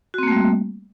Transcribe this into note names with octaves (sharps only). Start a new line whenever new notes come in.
G3 A3 A#3 C4 F#4